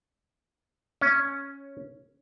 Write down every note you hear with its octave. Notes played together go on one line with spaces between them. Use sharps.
C#4